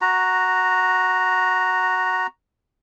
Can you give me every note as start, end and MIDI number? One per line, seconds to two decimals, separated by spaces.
0.01 2.27 66
0.01 2.27 82